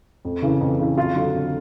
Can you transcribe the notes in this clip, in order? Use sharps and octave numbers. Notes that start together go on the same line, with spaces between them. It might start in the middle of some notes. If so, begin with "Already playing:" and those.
F2
C#3 E3
F2
C#3 E3
F2 F4
D3 F#3
F2